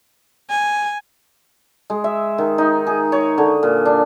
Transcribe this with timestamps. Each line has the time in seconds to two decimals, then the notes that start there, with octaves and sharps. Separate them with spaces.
0.50 G#5
1.90 G#3
2.04 E5
2.38 D#3
2.58 D#4
2.87 G#4
3.12 C#5
3.38 D3
3.63 A#2
3.85 D4